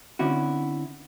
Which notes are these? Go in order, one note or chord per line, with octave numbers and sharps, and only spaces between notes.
D3 C4 C#4 E4 F#4